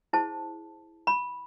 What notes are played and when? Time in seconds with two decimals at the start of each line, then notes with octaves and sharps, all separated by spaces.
0.13 E4 G#4 C5 A5
1.07 B5